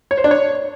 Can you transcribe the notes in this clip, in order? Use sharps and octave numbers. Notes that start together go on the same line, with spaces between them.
C#5
C5
D4
C#5